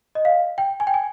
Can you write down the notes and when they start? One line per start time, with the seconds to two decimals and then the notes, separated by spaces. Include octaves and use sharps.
0.15 D#5
0.25 F5
0.58 G5
0.80 G#5
0.87 G5
0.94 G#5